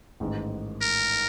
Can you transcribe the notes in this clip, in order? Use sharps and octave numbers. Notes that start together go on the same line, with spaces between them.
A1 G#2 D#3
A#4